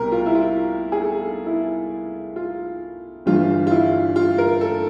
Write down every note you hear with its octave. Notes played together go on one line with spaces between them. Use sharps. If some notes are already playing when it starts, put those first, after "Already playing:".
Already playing: C2 B2 A#4
F4
E4
F4
G#4
A4
E4
F4
G1 G2 E3 F4
F4
E4
F4
A#4
A4